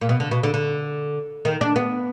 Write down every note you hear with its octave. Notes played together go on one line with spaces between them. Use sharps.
A#2
B2
D3
B2
D3
D3
D#3
D4
B3